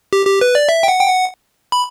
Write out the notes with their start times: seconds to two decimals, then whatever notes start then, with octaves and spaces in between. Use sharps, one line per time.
0.13 G4
0.26 G4
0.41 B4
0.55 D5
0.69 E5
0.83 G5
0.88 F#5
1.00 G5
1.08 F#5
1.72 B5